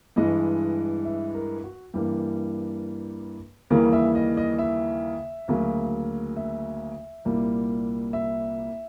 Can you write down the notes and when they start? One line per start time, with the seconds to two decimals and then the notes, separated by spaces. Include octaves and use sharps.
0.16 G2 E3 G#3 D#5
1.05 E5
1.34 A#4
1.64 F#4
1.94 G2 E3 G3 A#3 G4
3.70 D#2 C#3 E3 G3 A#3 A#4
3.93 E5
4.15 D#5
4.37 D#5
4.59 E5
5.48 D2 C#3 F#3 A#3
6.37 E5
7.25 C2 A#2 G3 A#3
8.13 E5